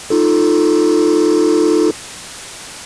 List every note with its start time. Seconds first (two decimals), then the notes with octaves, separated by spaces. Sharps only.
0.10 D#4 F4 A4